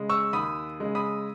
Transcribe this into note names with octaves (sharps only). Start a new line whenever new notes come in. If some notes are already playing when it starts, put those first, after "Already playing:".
Already playing: C#3 G#3
C#6 E6
D#2 B5 D#6
C#3 G#3
B5 D#6